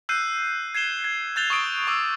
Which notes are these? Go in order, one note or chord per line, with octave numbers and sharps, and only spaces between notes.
E6 F#6 G6 C7 D#7
G#6 C7 E7 G7
G#6
F#6 G6 A6 F7 G7
C#6 D#6 D7
C#6 D6 E6